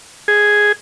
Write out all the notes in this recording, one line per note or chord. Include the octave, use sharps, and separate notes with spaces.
G#4